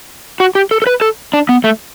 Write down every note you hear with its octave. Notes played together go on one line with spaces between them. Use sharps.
F#4
G4
A4
A4
B4
A4
D4
B3
A3